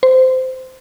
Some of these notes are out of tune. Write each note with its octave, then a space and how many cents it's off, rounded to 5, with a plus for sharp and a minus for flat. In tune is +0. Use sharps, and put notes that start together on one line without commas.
C5 -15